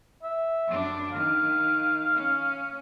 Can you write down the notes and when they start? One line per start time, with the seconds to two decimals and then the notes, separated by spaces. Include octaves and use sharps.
0.23 E5
0.68 F#2 D4
1.13 D#3 F5
2.16 C#4